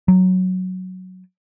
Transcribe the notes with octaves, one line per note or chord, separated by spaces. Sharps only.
F#3